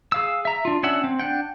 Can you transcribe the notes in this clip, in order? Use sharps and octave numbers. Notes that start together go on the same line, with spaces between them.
G#4 F5 E6
E5 A#5
D4 F4
C#4 D4 E5 F#5 E6
C4
D4 F#5 G5